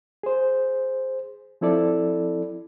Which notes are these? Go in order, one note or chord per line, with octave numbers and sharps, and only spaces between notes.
G#4 C5
F3 C4 E4 A4 D5